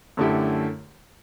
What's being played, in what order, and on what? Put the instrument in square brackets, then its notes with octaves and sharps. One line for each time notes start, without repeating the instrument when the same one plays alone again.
[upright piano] F#2 D3 A3 E4 G4